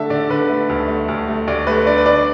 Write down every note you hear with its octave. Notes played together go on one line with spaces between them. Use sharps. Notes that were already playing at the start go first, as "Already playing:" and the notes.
Already playing: D3 A3 E5 A5
D3 D5
D3 B4
A3
D2
A3
D2
A3
D2 D5
A3 B4
D4 D5
B4
D4 D5